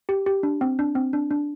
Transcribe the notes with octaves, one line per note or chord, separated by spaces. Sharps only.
G4
G4
D4
C4
D4
C4
D4
D4